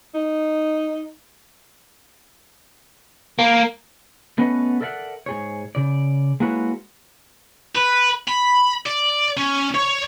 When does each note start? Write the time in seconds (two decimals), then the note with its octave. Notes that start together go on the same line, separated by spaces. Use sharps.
0.14 D#4
3.39 A#3
4.38 A3 B3 C#4 B4 D#5 F#5
4.81 A4 A#4 D5 E5 F#5
5.26 G#2 G#4 C#5
5.75 C#3 D5
6.40 G#3 A#3 E4 F#4 B4 C#5
7.75 B4
8.28 B5
8.86 D5
9.37 C#4
9.74 C#5